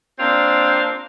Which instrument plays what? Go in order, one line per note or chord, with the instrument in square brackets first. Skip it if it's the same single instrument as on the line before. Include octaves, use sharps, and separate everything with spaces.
[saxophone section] A#3 C4 D4 F4